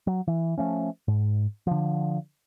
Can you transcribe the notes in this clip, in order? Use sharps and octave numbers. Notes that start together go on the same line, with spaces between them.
F#3
E3
F3 A3 C#4
G#2
D3 F3